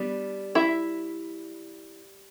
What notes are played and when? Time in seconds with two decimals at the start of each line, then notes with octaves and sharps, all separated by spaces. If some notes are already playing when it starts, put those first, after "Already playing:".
Already playing: G3 B3 D4
0.55 E4 E5